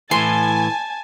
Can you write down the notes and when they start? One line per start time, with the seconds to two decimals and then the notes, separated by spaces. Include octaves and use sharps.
0.11 A2 E3 G#5 A5 C6